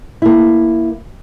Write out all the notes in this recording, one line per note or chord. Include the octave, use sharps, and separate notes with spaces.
A#3 E4